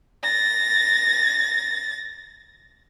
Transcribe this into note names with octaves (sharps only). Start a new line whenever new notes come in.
A6 A#6